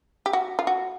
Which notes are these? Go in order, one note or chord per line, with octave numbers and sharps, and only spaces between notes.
G4
F#4
F4
F#4